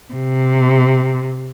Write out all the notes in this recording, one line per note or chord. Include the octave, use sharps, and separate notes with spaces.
C3